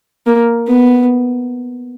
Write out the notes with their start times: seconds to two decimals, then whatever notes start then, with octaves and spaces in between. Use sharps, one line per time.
0.27 A#3
0.68 B3